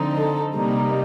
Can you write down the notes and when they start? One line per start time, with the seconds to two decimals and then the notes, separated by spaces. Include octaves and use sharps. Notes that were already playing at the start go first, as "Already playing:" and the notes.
Already playing: D3 F3 C4 D#4
0.17 A4
0.55 C3 G3 A#3 D#4